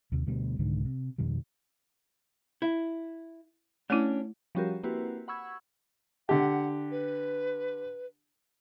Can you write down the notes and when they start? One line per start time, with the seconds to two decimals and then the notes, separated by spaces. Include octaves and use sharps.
0.12 D#2 C3
0.27 D2 B2 G3 B3
0.59 C2 G#2 D3 D#3
0.85 C3
1.18 F2 B2 D#3 G3
2.62 E4
3.90 A3 C#4 D4 E4
4.55 F3 G3 C#4 F#4 G4 A#4
4.83 A#3 C4 E4 F#4 G4 B4
5.28 F#5 B5 C#6 E6 G#6
6.29 D3 G4 F#5
6.91 B4